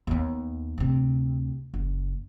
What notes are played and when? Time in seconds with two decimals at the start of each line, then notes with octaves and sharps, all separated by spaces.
0.07 D#2 B3
0.78 D2 C3
1.74 F#1